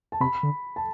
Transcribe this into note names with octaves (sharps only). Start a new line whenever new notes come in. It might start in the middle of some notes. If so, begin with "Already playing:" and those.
A5
C3 B5
D3
A5